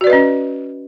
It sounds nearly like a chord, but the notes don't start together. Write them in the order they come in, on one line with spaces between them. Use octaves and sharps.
F#4 D5 B4 D#5 C#4